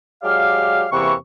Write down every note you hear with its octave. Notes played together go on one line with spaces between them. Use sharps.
F#3 G#3 G4 D5 F5
E2 C3 E3 A#3 B4 C#6